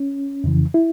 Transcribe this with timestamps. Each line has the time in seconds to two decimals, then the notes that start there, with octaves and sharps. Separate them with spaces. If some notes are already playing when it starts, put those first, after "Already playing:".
Already playing: C#4
0.44 F2 C#3 E3
0.74 E4